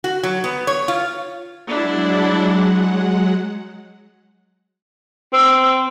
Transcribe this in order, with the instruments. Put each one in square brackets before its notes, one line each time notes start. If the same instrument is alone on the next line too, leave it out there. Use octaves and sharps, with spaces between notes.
[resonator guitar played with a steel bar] F#4
F#3
B3
C#5
F4
[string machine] F#3 G#3 F#5 [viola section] D4 E4
[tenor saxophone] C4 [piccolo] E6